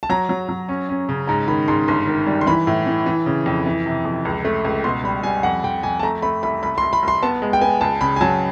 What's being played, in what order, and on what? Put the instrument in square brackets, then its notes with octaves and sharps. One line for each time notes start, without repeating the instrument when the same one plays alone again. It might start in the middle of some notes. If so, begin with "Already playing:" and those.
[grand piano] A5
[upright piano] F#3 [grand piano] A#5
[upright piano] F#3
F#3
C#4
C#4
C#3
[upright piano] G#2 [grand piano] A#5
[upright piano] D#3 [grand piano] B5
[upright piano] G#2 [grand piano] C6
[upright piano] G1 [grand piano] C6
[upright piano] D#3
G3
[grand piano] C6
[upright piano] E3 [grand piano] B5
[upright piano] A2
E3
E3
C#3
F2
E3
C3
F2
C#2
A3
C#2
[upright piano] B2 [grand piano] C6
[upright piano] G3 [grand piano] B5
[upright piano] G3 [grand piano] G#5
[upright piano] F2 [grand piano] F#5
[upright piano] F2 [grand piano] G5
[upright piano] F2 [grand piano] G#5
[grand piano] A5
[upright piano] A3 [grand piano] A#5
[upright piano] A3 [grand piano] B5
[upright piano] C2 [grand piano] B5
[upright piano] C2 [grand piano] B5
[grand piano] C6
[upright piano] C2
[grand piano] B5
[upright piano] C2 [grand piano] C6
[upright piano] B3 [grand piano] A5
[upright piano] G#3
[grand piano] G5
[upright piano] B3 [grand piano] G#5
[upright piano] C#2 [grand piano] A5
[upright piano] C#3 [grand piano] B5
[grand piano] G#5
[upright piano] F#3 [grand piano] A5